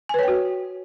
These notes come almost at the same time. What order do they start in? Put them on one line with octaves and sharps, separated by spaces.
G#5 B4 C#5 G5 F#4